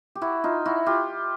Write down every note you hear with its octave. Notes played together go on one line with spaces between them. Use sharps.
G4
E4 F#4
D#4 F4
E4 F#4
F4 G4